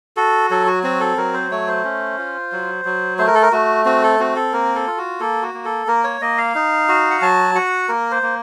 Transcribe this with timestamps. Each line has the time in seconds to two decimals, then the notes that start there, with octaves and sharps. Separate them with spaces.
0.17 F#4 A4
0.50 F#3 A4
0.67 F#4
0.83 C4 F#4
1.00 A4
1.17 F#3 A#4
1.34 C5
1.51 A3 C#5
1.68 C5
1.85 C#4
2.18 F4
2.52 F#3
2.85 F#3
3.18 A3 C5
3.27 A#4
3.35 A4
3.42 A#4
3.52 A3 F#4
3.85 C4 F#4
4.03 A4
4.20 C4 F#4
4.36 A4
4.53 A#3 A#4
4.75 A4
4.87 F4
4.98 F#4
5.20 A#3 A4
5.42 F#4
5.54 A#3
5.65 A4
5.87 A#3 A#4
6.04 C#5
6.21 A#3 D#5
6.38 F5
6.55 D#4
6.88 F#4
7.11 F#5
7.21 F#3 A5
7.55 F#4 F#5
7.89 A#3 A#4
8.11 C5
8.23 A#3